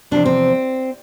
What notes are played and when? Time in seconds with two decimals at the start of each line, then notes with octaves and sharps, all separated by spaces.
0.11 E2 C3 F3 D4
0.25 C4